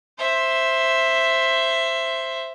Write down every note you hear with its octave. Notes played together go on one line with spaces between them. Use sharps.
C5 E5